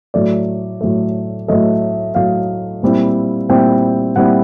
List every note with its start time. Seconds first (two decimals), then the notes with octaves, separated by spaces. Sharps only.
0.14 A2 F#3 A3 D5
0.81 A2 F#3 A3
1.48 A2 F#3 A3 D#5
2.15 A2 F#3 A3 F5
2.83 A#2 G3 C4 E4
3.49 A#2 G3 C4 E4 G5
4.16 A#2 G3 C4 E4 F#5